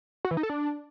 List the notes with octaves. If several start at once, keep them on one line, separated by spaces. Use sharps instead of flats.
F#4
E3
D#4
A4
D4